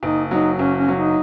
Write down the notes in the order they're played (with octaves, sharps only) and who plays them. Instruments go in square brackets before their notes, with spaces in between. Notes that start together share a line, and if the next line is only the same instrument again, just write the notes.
[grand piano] F#1 [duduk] D#4
[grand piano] F#3 [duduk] D#4
[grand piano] F#1 [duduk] C#4
[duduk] C#4
[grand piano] F#3
[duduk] D#4